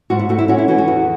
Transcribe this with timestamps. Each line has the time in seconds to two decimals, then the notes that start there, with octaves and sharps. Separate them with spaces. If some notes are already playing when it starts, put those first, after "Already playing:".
0.10 G#2 F#4
0.19 E4
0.29 A3 F#4
0.38 E4
0.48 C#4 F#4
0.58 E4
0.68 E3 F#4
0.78 F#4
0.88 E2